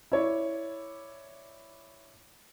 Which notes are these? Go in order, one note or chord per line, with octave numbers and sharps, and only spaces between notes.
E4 C#5 D5